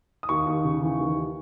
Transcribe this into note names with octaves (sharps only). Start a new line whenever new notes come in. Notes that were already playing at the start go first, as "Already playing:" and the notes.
D#6
D#2 C#6
D#2
C#3
E3
D#2